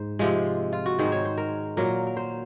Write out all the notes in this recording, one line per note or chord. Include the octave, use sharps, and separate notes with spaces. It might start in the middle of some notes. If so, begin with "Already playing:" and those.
Already playing: G#2 C5
C3 F3 G#3
F4
F#4
G#2 D#3 G#3 C5
C#5
C5
A#4
A#2 F#3 A#3 A#4
A#4
C5